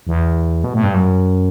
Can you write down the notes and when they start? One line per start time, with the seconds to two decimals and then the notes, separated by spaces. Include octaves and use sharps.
0.07 E2
0.64 B2
0.73 A2
0.83 G2
0.94 F#2